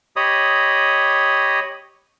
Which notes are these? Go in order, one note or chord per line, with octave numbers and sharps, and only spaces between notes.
G4 C#5 D#5 B5 D#6